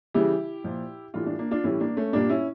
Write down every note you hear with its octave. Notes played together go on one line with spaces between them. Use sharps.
C#3 E3 G3 E4 G4
A#2 F3
A2 E3 G3 D4 F4
D4 F4
A#3 D4
D4 F4
A2 E3 G3 C#4 E4
A#3 D4
A3 C#4
A#2 G3 A#3 D4
C#4 E4